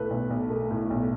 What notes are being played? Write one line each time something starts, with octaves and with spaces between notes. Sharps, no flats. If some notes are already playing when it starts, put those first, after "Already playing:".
Already playing: B1 A2 A3 A4 B4
B1
B1
A3
A2
B1